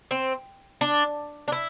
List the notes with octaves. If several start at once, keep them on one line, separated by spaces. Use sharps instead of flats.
C4
D4
D4
E4